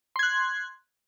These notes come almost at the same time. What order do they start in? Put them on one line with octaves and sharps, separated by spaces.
C6 G#6 F#6